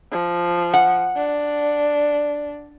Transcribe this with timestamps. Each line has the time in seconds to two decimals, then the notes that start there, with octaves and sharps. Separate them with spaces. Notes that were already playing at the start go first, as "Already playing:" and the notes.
0.12 F3
0.74 F#5
1.16 D4